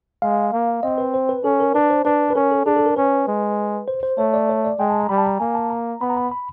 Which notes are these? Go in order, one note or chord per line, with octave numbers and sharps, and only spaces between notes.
G#3 F5
A#3
C4 D#5
B4
C5
B4
C#4 A4
A#4
D4 B4
C5
D4 B4
B4
C#4 A#4
A4
D4 G#4
A4
A#4
C#4 B4
G#3
C5
C5
A3 C#5
D5
C#5
D5
G#3 G5
A5
A#5
G3 B5
A5
A#5
A#3 G#5
A5
A#5
B3 B5
A#5
B5
B5